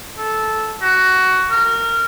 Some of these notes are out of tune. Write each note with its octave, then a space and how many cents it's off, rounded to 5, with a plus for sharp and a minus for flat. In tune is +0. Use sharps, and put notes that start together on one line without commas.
A4 -10
F#4 +15
A#4 -20